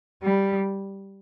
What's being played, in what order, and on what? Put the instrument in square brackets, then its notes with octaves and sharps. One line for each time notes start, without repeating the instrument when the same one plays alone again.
[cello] G3